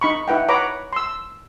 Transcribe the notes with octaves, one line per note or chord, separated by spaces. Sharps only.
D#4 B5 C#6
D#4 E4 B4 F#5 G5
B4 C#5 F#5 A#5 B5 D6
C6 E6